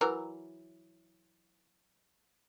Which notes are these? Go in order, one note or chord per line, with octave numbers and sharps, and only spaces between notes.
E3 F#3 A#4